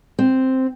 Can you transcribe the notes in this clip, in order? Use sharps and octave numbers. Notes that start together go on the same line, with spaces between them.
C4